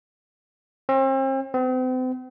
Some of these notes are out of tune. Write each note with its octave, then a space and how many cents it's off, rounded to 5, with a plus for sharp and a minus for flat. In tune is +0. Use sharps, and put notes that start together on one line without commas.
C4 +40
C4 -40